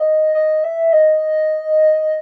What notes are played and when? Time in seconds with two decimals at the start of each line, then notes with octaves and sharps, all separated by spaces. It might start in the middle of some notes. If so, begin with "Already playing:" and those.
Already playing: D#5
0.35 D#5
0.64 E5
0.93 D#5